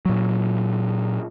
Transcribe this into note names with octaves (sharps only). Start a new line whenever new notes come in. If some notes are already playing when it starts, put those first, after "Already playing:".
A#2 F#3